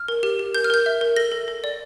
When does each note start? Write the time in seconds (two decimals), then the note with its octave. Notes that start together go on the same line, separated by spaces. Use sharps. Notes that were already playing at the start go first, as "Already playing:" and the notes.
Already playing: F6
0.08 A#4
0.23 G4
0.39 G4
0.55 A#4 G6
0.64 F6
0.70 A#4 G6
0.86 E5
1.01 A#4
1.16 A4 A#6
1.31 A4
1.48 A4
1.64 D5